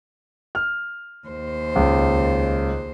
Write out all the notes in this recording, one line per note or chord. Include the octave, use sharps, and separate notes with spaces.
F6
D#2 C5
C#2